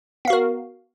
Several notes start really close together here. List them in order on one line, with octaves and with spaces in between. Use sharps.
B3 F5 F#4 A#4